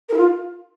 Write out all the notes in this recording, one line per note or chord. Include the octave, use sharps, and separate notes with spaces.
A#4
E4
F4